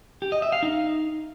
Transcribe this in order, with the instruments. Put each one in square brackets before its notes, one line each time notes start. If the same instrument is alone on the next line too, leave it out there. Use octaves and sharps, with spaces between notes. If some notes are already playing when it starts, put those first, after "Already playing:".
[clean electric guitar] G4
D#5
E5
F5
D#4